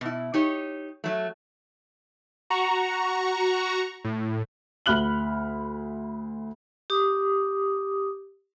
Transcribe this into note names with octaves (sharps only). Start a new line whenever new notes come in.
B2 E4
D#4 G4 C#5
F#3 A3
F#4 A#5 C#6
A2
D2 B5 F6 F#6 F#7 G7
G4 D6 D#6